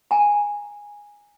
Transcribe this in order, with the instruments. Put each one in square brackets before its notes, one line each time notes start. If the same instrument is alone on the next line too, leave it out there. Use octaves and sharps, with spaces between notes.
[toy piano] G#5 A#5